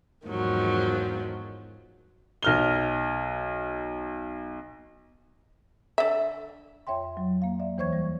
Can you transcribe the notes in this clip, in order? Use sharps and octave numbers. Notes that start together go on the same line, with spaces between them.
E2 G#2 D#3 F3 F#3
B1 F6 G7
D3 E5
F2 C#5 E5 G5 C6
F#3
A#3 F5
D5 E5
D#2 E3 C5 C#5 C#6 G#6
G3